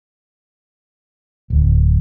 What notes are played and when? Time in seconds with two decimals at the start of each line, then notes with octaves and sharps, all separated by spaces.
1.50 D1